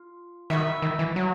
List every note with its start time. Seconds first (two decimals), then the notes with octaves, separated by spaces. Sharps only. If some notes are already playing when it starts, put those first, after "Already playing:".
Already playing: F4
0.50 D#3 F#4 B4 E5
0.82 D#3
0.99 E3
1.16 F#3